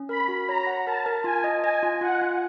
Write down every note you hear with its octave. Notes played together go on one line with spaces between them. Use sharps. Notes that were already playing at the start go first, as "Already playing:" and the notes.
Already playing: C#4
A#4 B5
F#4
C#5 A#5
F#5
A#4 A5
A#4
F4 G#5
D#5
D#5 G#5
F4
F4 F#5
F4